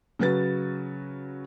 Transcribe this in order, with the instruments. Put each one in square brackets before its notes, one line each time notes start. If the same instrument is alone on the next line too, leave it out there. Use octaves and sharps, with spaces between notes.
[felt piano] C#3 F#3 F#4 B4 A6